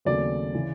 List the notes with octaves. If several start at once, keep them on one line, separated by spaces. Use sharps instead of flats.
D#2 C#3 F#3 A3 C4 D5
C#3 E3